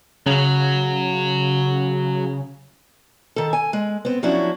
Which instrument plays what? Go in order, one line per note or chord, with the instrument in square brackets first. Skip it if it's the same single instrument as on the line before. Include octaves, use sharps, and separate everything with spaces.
[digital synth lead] C#3 [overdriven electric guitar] F#3
[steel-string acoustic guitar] D#3 A4
G#5
G#3
B3 C4
F3 F#3 C#4 D4 E4 F#4